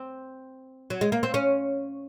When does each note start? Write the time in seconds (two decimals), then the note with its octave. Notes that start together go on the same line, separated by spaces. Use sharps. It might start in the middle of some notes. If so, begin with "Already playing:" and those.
Already playing: C4
0.90 F#3
1.01 G#3
1.12 A#3
1.23 C4
1.34 C#4